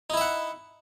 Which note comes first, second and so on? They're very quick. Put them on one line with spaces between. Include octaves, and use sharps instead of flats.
D#4 E4 E5 F#5